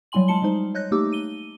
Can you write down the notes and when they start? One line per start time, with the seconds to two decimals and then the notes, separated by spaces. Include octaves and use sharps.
0.12 F#3 G3 E4 G#5 C6 F#7
0.28 G#3 F4 A5 C#7 G7
0.42 G3 G#3 D#4 C5
0.75 C#5 D#5 F#6 G6 A#6
0.91 A3 A#3 D#4 G4 D6 E6
1.13 D#7 G7